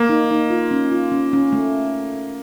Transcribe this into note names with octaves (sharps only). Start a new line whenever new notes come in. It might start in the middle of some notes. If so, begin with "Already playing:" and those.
Already playing: A#3
D#4
D#4
F4
C#4
F4
C#4
C#4
A3